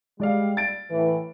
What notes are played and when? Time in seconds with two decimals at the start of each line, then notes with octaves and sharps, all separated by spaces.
0.20 G3 G#3 D5 F5
0.57 A6 D7
0.91 A2 E3